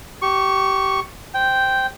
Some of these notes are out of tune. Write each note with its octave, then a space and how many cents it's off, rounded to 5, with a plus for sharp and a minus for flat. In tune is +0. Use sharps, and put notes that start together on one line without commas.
G4 -25 C#6 +0
C5 +0 G5 -5